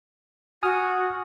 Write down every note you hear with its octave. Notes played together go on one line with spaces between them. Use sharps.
F#4 G#5 D#6 F6